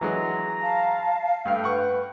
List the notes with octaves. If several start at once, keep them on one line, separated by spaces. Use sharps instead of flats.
E3 F#3 G#3 A#5
F5 A5
G2 A3 A4 G5 F6
B4 F#5 C#6